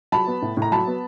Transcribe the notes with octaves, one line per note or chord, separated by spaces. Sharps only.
F#3 A5 B5
B3
A2
A2 A#5
F#3 A5 B5
B3